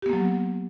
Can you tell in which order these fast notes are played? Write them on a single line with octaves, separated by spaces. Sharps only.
G4 B3 A#3 F#3